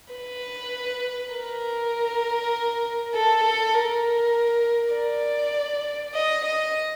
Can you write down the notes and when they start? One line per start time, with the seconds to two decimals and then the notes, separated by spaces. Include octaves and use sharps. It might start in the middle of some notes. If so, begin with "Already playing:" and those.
0.14 B4
1.34 A#4
3.14 A4
3.44 A4
3.74 A#4
4.94 D5
6.14 D#5
6.45 D#5